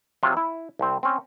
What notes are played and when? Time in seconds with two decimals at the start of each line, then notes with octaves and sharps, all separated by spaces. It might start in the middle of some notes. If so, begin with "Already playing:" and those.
0.23 C3 F#3 F4
0.37 E4
0.79 C2 C4
1.03 C4 C#4